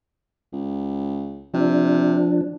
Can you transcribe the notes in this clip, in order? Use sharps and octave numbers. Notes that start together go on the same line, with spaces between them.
C#2
C3 F3 D4